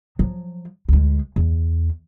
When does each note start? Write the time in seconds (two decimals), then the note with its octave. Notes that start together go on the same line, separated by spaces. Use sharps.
0.19 F3 F#3
0.89 D2 G#3
1.36 E2